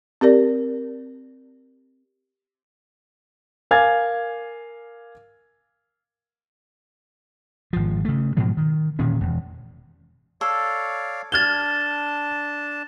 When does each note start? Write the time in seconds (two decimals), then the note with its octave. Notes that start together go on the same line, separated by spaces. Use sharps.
0.21 C4 G4 A#4 D5
3.71 A#4 F5 G#5 D6 G#6 A6
7.73 G#1 F3
8.05 C#3 A3
8.37 G#2 B2 F3 F#3
8.57 D#3
8.99 E1 A#2 D#3 C#4
9.21 E1
10.41 A4 C#5 D5 F5
11.32 D4 A5 F6 G#6 A6 G7